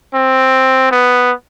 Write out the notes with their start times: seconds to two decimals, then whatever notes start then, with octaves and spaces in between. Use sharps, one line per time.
0.14 C4
0.91 B3